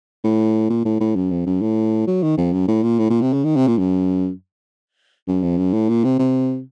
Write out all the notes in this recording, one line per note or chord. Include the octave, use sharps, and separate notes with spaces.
A2
A#2
A2
A2
F#2
F2
F#2
A2
F#3
D#3
F2
F#2
A2
A#2
A2
A#2
C3
C#3
D#3
C3
A#2
F#2
F#2
F2
F#2
A2
A#2
C3
C3